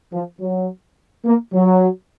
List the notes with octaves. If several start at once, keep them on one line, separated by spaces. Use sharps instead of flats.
F3
F#3
A#3
F#3